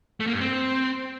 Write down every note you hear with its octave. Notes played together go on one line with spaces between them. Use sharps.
A3
A#3
G2
C4